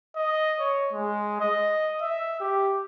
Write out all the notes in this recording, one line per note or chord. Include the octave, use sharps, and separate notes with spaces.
D#5
C#5
G#3
D#5
E5
G4